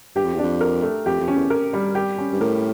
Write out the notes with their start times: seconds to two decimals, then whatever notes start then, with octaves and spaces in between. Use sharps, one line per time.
0.15 G2 G4
0.25 F2
0.34 E2 D4
0.43 F2
0.61 A#4
0.82 A3
1.06 F2 G4
1.20 F2
1.28 C#4
1.35 E2
1.50 A#4
1.73 G3
1.95 G4
2.18 C#4
2.33 G2
2.40 A2 A#4